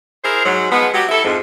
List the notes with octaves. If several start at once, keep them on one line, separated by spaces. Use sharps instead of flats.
E4 G#4 A#4 C5
G#2 F#3
F3 G#3 B3
F#3 G4
E4 A4
F2 G#2